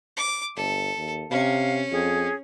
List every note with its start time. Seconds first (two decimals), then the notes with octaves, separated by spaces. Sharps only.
0.17 D6
0.56 G1 A4
0.97 D#2
1.31 C3 C#4 F5
1.92 F2 G#4